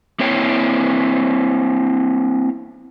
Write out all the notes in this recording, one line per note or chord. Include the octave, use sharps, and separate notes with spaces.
A#3 C4 E4 C#5 G5